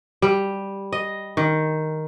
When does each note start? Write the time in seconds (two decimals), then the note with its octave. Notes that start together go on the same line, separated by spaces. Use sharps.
0.22 G3
0.93 D#5
1.37 D#3